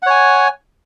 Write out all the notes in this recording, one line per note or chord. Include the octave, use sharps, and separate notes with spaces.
C#5 F#5 G#5